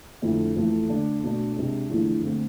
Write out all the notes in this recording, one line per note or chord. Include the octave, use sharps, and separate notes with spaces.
F2 D3 A3 E4
F2 E3 A3
D3 A3 D4
B2 A3 D4
C3 G#3 D4
E2 D3 F3 A3 D4
D3 A3 C4